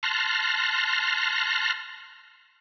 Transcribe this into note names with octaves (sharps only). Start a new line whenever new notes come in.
A5 C6 F6 F#6 A#6